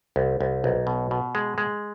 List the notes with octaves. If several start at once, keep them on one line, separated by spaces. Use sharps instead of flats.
C2
C2
B1
B2
B2
G#3
G#3